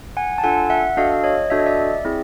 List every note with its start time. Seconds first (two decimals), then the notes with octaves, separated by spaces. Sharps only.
0.17 F#5 G#5
0.38 A5
0.44 D4 F4 A4 F#5 G#5
0.70 E5 F#5
0.97 D4 F#4 A4 D#5 F5
1.24 C#5 D#5
1.50 D4 F#4 A4 E5
1.58 D#5
1.66 D5 E5
2.05 C4 E4 G#4